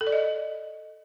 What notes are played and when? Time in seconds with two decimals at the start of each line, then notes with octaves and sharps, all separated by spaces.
0.01 A4
0.07 D5
0.12 D#5